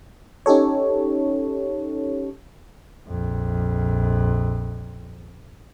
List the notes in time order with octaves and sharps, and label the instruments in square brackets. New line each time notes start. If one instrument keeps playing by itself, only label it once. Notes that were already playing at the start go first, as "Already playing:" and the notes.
[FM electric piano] C#4 D#4 G4 A4 C#5
[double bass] A#1 F2